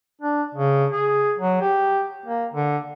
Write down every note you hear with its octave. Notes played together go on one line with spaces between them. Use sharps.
D4
C#3
G#4
F#3
G4
A#3
D3